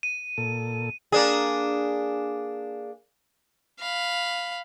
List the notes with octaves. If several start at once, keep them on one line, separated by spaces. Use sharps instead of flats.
D#7
A#2 A4
A#3 D4 G#4
F5 B5